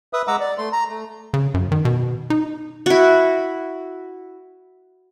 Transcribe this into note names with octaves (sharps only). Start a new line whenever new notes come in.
B4 E5 D#6
G#3 F#5 A#5 D6 E6
D5
A3 C6
A#5
A3
C#3
F#2
D#3
B2
D#4
E4 F#4